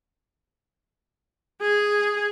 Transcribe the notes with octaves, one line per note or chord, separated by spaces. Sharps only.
G#4